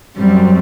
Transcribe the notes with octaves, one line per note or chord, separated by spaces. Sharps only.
F#2 F#3 G3 C4